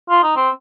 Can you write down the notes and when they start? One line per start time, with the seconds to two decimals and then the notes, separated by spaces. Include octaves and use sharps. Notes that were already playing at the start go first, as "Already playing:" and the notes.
0.09 F4
0.23 D#4
0.36 C4